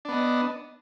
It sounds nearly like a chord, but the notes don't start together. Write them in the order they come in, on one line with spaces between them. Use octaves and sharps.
D4 B3 D#5